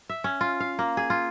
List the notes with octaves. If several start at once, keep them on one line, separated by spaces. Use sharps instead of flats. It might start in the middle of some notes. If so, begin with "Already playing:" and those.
E5
C#4
F4
F5
A#3
G#4
F4